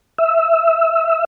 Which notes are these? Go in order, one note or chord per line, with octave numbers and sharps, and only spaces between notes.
E5